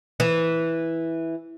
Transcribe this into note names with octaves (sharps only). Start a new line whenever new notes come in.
E3